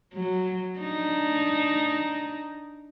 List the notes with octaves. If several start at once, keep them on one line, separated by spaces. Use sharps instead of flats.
F#3
D4 D#4